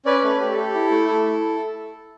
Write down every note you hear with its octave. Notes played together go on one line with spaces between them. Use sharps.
C#4 B4 D5
A3 B4
G4
A4
G4
E4
A3
E4
E4